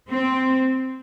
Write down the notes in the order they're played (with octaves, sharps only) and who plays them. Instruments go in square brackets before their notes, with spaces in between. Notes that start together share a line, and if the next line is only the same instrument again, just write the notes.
[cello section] C4